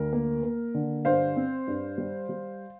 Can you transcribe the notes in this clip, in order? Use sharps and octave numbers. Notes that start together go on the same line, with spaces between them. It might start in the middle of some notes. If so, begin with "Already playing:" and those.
Already playing: D2 A#4
A#3
A#3
D3
G2 C5 F5
C4
G2
G3
G3